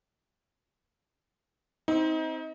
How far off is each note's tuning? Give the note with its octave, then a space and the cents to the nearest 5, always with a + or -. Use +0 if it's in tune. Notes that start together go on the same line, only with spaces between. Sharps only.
C4 +0 D#4 +30